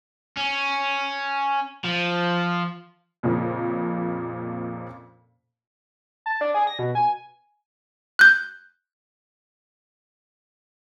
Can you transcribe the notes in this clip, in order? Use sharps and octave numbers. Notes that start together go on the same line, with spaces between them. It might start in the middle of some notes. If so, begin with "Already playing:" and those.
C#4
F3
F2 A#2 C#3 F3 A#3
A5
D4
G#4
A#6
B2
G#5
F#6 G6